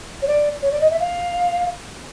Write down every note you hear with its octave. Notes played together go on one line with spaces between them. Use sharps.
C#5
D5
C#5
D5
D#5
E5
F5